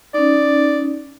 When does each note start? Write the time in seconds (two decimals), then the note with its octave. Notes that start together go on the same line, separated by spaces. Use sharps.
0.14 C#4 D#4 D5